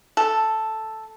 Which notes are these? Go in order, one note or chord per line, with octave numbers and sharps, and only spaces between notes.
A4